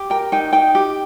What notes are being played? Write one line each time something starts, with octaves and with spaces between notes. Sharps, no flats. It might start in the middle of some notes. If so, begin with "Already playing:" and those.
Already playing: G4
A#4 G5
D#4 G5
D#4 G5
G4